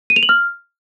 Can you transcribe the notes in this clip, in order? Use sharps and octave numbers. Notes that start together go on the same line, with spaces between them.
D#7
F7
F#7
F6